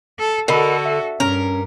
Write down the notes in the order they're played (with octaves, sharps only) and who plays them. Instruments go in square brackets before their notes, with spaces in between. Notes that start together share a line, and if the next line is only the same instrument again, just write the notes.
[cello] A4
[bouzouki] D3 [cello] F#4 A4 [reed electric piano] A#4 D#5 B5
[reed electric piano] E5
[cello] G2 [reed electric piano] C#4 [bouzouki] A#4